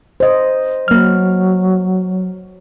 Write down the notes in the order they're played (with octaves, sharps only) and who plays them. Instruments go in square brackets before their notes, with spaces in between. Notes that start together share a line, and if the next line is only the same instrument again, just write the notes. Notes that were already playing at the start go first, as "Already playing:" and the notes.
[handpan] C5 D#5
[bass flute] F#3 [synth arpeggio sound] A#3 F6